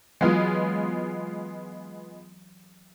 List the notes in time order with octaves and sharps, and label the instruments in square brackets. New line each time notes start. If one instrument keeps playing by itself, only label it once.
[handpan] E3 F#3 [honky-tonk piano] G#3 B3 F4